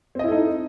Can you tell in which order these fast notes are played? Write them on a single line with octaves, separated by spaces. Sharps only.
C4 D#5 E4 A4 D#4